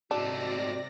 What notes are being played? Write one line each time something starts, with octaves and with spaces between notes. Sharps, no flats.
G#2 C3 A3 D4 F#4 D5 A#6